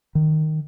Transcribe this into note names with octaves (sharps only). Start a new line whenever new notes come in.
D#3